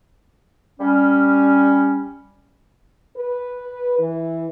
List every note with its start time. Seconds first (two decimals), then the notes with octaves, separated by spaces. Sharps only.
0.80 G3 C#4
3.17 B4
3.99 E3